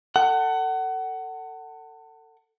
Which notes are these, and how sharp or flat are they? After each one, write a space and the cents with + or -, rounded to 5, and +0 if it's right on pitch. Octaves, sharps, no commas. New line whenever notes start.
A4 +30 F#5 +25